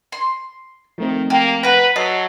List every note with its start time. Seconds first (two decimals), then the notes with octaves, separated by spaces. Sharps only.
0.12 C6
0.98 D#3 F3 A3 C4
1.30 A#3 G4
1.63 B4 F#5 A#5
1.96 F#3 A4 D#5 A6 C7